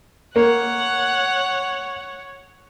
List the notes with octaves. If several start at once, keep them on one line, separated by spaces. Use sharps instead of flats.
A#3 C#5 F#5